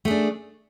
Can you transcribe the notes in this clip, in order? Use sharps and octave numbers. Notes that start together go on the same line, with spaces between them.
A3 D4 G#4